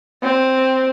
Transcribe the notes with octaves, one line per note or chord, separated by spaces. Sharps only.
C4